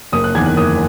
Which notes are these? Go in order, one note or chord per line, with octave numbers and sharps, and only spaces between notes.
F#1 D#6
F#6
E2 D#3 G#6
F#6
F#1 D#6